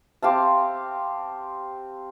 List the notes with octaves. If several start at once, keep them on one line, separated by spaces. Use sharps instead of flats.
C4 G4 F5 A5